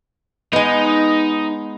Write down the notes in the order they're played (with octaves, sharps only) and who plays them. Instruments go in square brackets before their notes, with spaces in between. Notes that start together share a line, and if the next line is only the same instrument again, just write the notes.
[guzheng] G#3 B3 [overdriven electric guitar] D#4